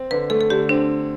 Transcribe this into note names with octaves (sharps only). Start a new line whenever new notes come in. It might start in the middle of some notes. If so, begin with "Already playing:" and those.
Already playing: C4
D3 B4
A3 A4
A4
D3 G4
C4 D4